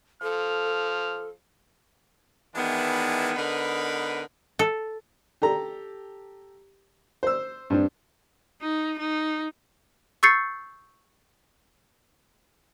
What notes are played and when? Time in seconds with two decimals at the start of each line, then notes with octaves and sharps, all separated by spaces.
0.22 F3 A4 F6
2.56 D#3 E3 G#3 B3 D4 E4
3.35 D3 B3 D#4 A#4 B4
4.59 A4
5.42 G4 A4 A#5
7.23 C5 E6
7.70 G2 C4 D4
8.61 D#4
8.99 D#4
10.23 C#6 E6 G6 A6 C7 C#7